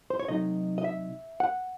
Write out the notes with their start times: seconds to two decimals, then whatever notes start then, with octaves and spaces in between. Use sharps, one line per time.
0.10 C5
0.19 C#5
0.28 C3 F#3 A3 D#4 D#5
0.78 D#5
0.84 E5
1.40 F#5